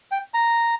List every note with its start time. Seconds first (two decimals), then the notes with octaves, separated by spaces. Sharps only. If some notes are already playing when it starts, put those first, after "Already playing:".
0.11 G5
0.34 A#5